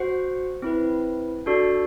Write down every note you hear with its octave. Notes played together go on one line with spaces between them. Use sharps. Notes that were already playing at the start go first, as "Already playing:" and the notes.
Already playing: F#4 C5 F#5
C4 E4 B4
D4 F#4 A4 D5